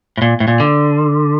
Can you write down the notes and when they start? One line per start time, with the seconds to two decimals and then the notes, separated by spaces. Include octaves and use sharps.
0.17 A2
0.22 A#2
0.40 A2
0.48 A#2
0.60 D3